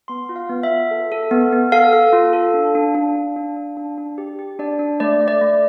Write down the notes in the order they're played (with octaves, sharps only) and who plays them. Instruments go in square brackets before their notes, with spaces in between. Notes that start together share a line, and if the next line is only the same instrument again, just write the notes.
[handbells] B3 C6
F4
F5
B3
E5
F4
A4
A4
B3
B3
A4 F5
A4
F4
A4
D4
D4
D4
D4
D4
D4
D4
D4
G4
G4
D4 D5
D4
A3 D5
A3
D5
A3